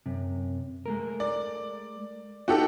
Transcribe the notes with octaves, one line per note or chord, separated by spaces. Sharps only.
F#2 C3
G#3 A3 A#4
D5
B3 D#4 F#4 G4 A4